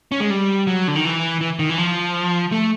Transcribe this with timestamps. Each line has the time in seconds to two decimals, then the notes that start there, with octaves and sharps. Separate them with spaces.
0.12 C#4
0.20 G#3
0.30 G3
0.67 F#3
0.88 D3
0.96 D#3
1.05 E3
1.41 E3
1.59 D#3
1.69 E3
1.78 F3
2.52 A3